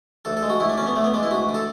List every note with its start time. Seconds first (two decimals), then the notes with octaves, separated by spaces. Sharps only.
0.25 D2 A4
0.37 A4
0.42 G#3
0.50 F#4
0.60 D2 E4
0.69 D4
0.78 D3 C#4
0.86 B3
0.96 D2 A3
1.04 B3
1.14 G#3 D4
1.23 E4
1.31 D2 F#4
1.49 D3
1.54 A4